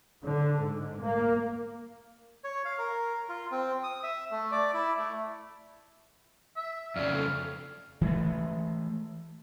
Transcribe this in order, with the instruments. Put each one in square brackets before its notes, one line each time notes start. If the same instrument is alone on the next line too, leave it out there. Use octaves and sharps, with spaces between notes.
[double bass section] D3
G#2
A#3
[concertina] C#5
F5
A#4
F4
C4
D#6
E5
A3
D5
E4
A3
[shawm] E5
[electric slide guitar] F2 C#3 [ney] D5 [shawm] F5
[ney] A4
[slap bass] E3 F#3 G#3 A3